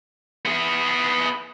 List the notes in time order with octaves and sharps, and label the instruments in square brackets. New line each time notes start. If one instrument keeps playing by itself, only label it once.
[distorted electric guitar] B3 G#4